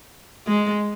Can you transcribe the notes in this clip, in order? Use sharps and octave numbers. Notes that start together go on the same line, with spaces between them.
G#3